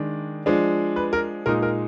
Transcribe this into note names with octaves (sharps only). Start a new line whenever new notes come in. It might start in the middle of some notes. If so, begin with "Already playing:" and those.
Already playing: D#3 G#3 D4
F3 G#3 D4
B4
A#4
A#2 G#3 D#4 A#4
A#4